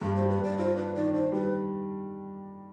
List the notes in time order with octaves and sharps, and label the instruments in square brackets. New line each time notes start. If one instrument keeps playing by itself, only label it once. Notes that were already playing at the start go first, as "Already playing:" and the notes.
[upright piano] G2 [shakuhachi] G4
[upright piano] G3 [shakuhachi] C5
[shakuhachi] B4
[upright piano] G2 [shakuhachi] D5
[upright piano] F4 [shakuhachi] C5
[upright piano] D4 [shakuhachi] B4
[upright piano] D#3 [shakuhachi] D5
[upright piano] D4 [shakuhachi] C5
[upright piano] G3 [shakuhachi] B4